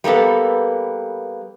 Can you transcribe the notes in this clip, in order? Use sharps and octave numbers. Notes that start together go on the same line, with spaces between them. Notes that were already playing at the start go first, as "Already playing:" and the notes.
G3 A#3 B3 A4 B4